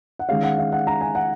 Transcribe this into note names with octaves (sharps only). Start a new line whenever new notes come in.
F#5
D#3 G#3 C#4 F5
F#5
F5
F#5
A#5
G#5
F#5